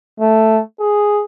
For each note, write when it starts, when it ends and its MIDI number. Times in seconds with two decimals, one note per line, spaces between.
0.20 0.61 57
0.80 1.23 68